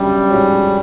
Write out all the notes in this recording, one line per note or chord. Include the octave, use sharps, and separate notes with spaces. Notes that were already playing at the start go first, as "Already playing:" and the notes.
Already playing: G1 F#2 C#3 G3
G#2 F3 G#3 C#4 F#4